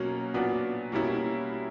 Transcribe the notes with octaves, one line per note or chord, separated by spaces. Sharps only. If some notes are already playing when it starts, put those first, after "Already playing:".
Already playing: B2 F#3 A#3 C#4
A#2 F#3 B3 D4 F#4
B2 G3 A#3 C#4 E4